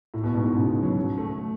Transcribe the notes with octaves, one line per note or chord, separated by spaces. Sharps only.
A2
B2
G#2
B2
C#3
C#3
F#3
A3